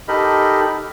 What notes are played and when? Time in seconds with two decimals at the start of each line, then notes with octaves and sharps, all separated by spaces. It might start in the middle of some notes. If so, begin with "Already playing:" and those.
0.08 D#4 G4 A4 A#4 D#5 B5